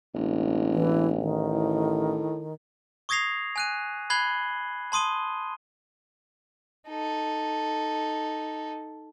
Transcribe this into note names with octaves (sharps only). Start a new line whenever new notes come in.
E1 A1
E3
D#3
A2
C#6 D#6 G#6 A#6 C7 F7
G#5 F#6 D#7
B5 F#6 G#6 C7 F#7 G7
A5 C6 D#6 D#7 G7
D#4 A4